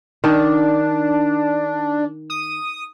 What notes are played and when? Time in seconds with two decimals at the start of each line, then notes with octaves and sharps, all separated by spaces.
0.24 D#3 D4
2.30 D#6